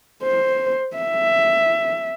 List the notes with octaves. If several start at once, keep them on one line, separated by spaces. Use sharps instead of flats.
C5
E5